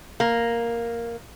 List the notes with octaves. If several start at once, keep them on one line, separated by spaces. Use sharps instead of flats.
A#3